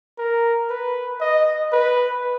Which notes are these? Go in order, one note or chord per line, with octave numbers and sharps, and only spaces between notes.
A#4
B4
D#5
B4